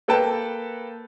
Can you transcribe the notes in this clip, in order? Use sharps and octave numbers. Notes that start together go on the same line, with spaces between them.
A#3 A4 B4 G5 A5